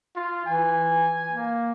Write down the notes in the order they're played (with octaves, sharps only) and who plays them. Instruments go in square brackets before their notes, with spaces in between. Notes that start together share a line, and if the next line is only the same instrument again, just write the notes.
[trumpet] F4
[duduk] E3 [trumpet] G#5
[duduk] A#3